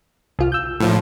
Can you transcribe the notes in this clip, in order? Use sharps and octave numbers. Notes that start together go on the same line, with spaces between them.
C2 F4 F6
E6 G6
A2 F3